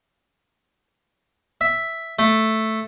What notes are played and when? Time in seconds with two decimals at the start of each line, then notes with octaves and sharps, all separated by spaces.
1.61 E5
2.19 A3